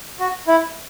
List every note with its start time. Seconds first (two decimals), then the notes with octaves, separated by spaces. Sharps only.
0.20 F#4
0.48 E4